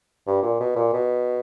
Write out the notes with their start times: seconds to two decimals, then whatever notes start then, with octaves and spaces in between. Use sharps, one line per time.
0.27 G2
0.43 A#2
0.60 B2
0.76 A#2
0.93 B2